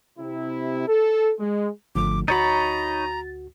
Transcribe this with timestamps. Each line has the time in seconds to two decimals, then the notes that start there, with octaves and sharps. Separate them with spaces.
0.19 C3 E4
0.88 A4
1.39 G#3
1.95 G#1 D3 F3 A3 D6
2.28 D2 D#4 F#4 C#5 A#5 B5 A6